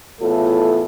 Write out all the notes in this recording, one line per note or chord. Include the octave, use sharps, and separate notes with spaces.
E2 A2 F4 A4